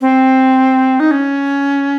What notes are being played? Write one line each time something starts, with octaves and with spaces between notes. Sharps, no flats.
C4
D#4
C#4